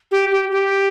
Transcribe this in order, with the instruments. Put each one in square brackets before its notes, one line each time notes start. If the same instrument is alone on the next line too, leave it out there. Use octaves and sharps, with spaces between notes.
[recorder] G4
G4
G4